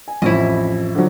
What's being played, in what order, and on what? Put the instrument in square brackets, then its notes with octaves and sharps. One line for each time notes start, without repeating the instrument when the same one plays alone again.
[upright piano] G#5
[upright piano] A1 F2 [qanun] E4 D#5
[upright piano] D3 F3 F#3